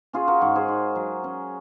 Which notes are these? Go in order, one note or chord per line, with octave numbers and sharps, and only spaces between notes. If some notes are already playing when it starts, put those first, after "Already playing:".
C#4 F4 G#4
F#4 A#4
G#2 F#4 A#4
G#4 C5
G#2
F#3
C#4